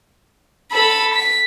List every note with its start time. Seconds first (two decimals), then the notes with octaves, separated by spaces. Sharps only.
0.72 A4 B5
1.14 B6